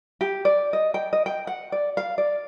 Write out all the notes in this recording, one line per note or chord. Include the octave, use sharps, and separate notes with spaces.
G4
D5
D#5
G5
D#5
G5
F#5
D5
F5
D5